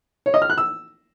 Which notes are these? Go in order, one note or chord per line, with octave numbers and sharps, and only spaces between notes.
C#5
D#5
F6
F#6
E6